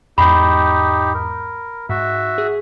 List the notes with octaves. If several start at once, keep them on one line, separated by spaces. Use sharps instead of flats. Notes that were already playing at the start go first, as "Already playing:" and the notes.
E2 G#2 D#4 G4 B5
A#4
G#2 F#4 E5
G#4